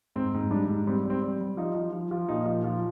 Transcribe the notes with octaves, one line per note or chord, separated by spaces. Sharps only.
G#2 C4
G#2
G3 D4
G#2
G3 C4
G3 C4
G3
G3
F3 D#4
F3
F3
F3
A#2 D#4
F3
F3